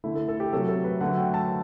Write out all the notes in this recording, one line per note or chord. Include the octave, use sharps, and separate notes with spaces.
D3 A3 E4
A4
A4
G4
C3 F#3 A3 A4
A4
B4
D3 F#3 A3 F#5
G5
A5